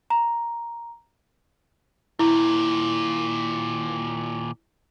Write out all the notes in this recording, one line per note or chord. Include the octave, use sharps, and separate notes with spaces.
A#5
D#2 A#2 E4